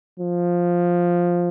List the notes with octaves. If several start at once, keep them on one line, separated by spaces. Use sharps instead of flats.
F3